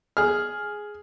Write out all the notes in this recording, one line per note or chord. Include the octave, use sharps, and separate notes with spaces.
G#4 F6